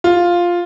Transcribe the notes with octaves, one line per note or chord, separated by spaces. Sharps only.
F4